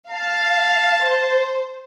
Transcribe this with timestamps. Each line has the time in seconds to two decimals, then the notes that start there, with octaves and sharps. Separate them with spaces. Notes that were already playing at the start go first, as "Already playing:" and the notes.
0.10 F5 A5
1.03 C5